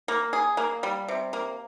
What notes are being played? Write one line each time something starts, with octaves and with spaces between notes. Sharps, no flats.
A#3
G#4
A#3
G3
C3
A#3